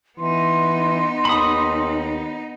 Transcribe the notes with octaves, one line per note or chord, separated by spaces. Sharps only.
E3 B3 D#4 C6
D#2 B5 D#6